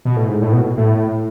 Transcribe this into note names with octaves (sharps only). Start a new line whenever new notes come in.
B2
A2
G#2
A2
B2
A2